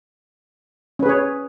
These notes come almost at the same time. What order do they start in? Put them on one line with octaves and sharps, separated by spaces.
C#4 B4 G#4 C#5